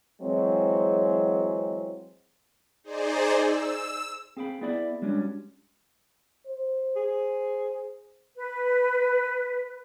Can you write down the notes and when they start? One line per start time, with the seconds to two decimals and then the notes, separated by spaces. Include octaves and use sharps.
0.22 E3 F#3 G#3 C4
2.84 D#4 G#4 C5 D5
3.39 E6
4.37 C4 G#4 F5 G5 B5
4.61 B3 E4 G#4 D5 E5 B5
5.02 G3 G#3 C#4 D4 F#4
6.47 C5
6.96 G#4
8.36 B4